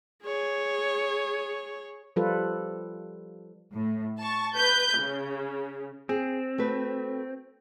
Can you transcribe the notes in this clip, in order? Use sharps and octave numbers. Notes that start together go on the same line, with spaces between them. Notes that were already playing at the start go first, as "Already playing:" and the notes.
G#4 C#5
F3 G3 F4 A4 B4
A2
A5 C#6
B4 G6
C#3
C4 G#4
A3 F#4 B4